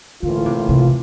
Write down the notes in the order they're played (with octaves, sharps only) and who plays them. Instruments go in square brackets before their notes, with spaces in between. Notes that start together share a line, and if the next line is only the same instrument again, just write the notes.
[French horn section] A2 E3 A#3 F4 [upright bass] D3
[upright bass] C3
C3